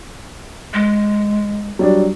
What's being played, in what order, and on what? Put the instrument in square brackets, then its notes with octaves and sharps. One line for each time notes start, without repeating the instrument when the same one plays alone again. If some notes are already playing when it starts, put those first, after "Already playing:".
[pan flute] G#3
[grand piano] F#3 G3 D4